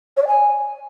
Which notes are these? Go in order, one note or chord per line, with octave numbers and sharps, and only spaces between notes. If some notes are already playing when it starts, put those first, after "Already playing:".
C#5
D5
G#5